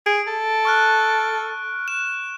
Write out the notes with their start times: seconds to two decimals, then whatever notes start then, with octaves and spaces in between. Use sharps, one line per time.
0.06 G#4 D7
0.27 A4
0.65 C#6 F6 F#6
1.88 F#6 E7